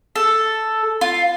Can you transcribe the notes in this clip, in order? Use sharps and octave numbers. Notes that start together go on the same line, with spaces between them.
A4
F4